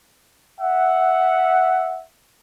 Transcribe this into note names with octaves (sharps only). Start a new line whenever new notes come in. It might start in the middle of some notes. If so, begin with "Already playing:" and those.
E5 F#5